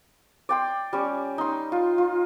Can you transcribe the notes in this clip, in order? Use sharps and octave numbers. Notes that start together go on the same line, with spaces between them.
D5 G5 C6
G3 C#4
D#4 C6
F4
F4